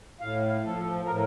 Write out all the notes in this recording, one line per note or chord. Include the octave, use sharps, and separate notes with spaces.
A2 F5
F3 A4
A#4
A2